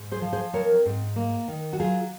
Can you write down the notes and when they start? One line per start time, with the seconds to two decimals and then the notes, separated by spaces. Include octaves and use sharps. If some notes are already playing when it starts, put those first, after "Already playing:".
Already playing: G#2
0.12 G#4 C5
0.21 F3
0.33 G#4 C5
0.53 C4 A#4 C#5
0.85 G#2
1.16 A#3
1.48 D#3
1.73 F#4
1.79 F#3 F4 G#4